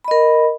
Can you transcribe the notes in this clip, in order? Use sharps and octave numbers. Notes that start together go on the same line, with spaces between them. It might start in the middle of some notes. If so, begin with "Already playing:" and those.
A#4 D#5 B5